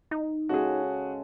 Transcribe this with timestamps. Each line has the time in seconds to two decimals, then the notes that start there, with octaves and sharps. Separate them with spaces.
0.11 D#4
0.49 C#3 G#3 F#4 G#4 A4